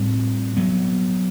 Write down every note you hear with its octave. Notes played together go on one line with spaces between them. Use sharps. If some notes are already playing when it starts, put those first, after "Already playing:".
Already playing: A2 G3 C4
F#3 B3